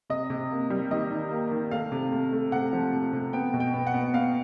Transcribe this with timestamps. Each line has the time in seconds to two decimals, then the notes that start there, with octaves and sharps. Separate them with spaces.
0.10 C3 D#5
0.30 C3
0.51 A#3
0.70 G3
0.91 D#3 D#5
1.10 D#3
1.31 A#3
1.51 D#3
1.71 A3 F5
1.92 C3
2.12 A3
2.32 A3
2.52 C3 F#5
2.73 F3
2.93 C3
3.13 C3
3.33 B3 G5
3.54 B2
3.60 G5
3.74 B3
3.87 F#5
3.94 B3
4.14 B3 F5